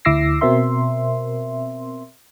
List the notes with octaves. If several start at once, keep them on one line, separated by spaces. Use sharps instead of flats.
D2 E4 D6 E6 A#6 C7
B2 C4 A#4 E5 C6